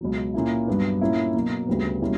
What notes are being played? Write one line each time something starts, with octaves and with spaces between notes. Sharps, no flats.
C#2 B2 F#3
A#2 A#3 C#4 E4
G2 F#3 B3 D4
A#2 A#3 C#4 E4
B2 F#3 A#3
D2 C#3 G3 B3
B2 G3 A#3 C#4 E4